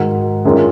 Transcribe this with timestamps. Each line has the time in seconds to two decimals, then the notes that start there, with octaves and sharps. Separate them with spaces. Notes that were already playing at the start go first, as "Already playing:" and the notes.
Already playing: G#2 D#3 G#3 D#4 F#4
0.45 F#2 D#3 G#3 C#4 F4